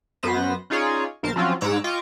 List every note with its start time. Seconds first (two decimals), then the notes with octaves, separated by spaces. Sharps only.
0.23 F#2 B3 B4 C5 A#6
0.70 C#4 D#4 F4 G#4 C#5 D5
1.23 B1 A#4 C5 A5 A6
1.36 F3 F#3 C4 C#4 F4 F#4
1.61 G#2 C#5 A#5 D6 E6 F#6
1.84 F4 D#5 G5 C#6 D6